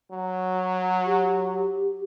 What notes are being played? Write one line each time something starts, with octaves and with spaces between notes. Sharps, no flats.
F#3
G4